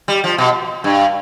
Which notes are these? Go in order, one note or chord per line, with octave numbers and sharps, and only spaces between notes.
G3
F3
B2
G2